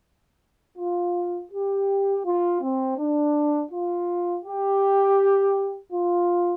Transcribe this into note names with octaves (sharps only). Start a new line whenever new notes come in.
F4
G4
F4
C4
D4
F4
G4
F4